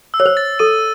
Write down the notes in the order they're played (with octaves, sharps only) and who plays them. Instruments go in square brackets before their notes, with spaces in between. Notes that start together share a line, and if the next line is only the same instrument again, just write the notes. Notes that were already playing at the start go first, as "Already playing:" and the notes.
[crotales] E6
[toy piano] C#5
C5
[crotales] A6
[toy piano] A4 [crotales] D#7